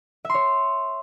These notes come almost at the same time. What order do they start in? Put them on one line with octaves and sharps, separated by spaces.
E5 C6 C#5